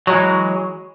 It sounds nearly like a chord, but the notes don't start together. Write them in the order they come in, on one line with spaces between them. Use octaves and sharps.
F#3 G#3 E3